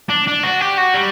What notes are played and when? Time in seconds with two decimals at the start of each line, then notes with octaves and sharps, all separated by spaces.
0.09 D4
0.27 D4
0.43 F#4
0.61 G4
0.78 F#4
0.94 G3